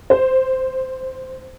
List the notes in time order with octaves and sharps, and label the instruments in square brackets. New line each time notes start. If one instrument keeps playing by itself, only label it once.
[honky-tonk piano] C5